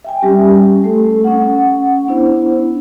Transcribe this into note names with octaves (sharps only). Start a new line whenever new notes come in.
E5 G5 G#5
G3 C#4 G4
A3 A4
C#4 F#5
B3 D4 E4 C5